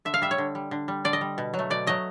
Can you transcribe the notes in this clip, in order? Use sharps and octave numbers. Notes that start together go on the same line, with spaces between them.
D3 E5
F5
G3 E5
C#5
D3
G3
D3
G3
D3 D5
D#5
G3
B2
F#3
A3
B2 D5
F#3 A3 D#5